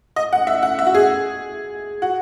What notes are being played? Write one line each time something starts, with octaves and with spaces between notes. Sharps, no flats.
D#5
F#5
E5
F#5
E5
F#4
G#4
F#4